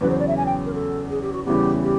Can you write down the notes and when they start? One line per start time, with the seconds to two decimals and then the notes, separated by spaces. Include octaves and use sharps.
0.01 E2 C#3 F#3 B4
0.10 C5
0.19 D5
0.28 E5
0.37 G#5
0.46 G5
0.65 A#4
0.74 A4
1.10 G#4
1.22 G4
1.33 F#4
1.45 E2 C#3 E3 G3 B3 G4
1.83 G4